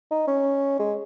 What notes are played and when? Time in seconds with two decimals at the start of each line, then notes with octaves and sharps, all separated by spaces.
0.11 D#4
0.28 C#4
0.79 G#3